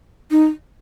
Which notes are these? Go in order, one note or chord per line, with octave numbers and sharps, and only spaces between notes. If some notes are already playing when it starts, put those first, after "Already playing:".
D#4